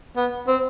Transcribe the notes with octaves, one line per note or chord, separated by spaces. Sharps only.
B3
C4